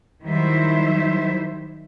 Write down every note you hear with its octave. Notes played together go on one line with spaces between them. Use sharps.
D#3 F#3 G3 E4 C5 E5